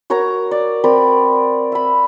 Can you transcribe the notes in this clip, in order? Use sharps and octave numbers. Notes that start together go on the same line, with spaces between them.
F#4 A#4 C#5 A#5
D5
C4 A#4 D5 B5
E5 B5